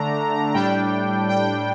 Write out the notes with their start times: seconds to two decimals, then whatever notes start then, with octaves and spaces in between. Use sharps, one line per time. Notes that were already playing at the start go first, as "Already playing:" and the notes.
Already playing: D3 A3 D4 A#5
0.54 A2 G3 D4 G5
1.29 G5